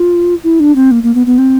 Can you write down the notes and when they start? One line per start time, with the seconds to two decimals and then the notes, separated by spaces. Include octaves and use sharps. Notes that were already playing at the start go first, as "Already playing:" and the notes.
Already playing: F4
0.44 E4
0.60 D4
0.76 C4
0.91 A#3
1.03 A#3
1.15 B3
1.26 B3
1.38 C4